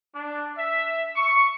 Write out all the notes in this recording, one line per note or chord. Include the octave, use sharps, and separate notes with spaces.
D4
E5
C#6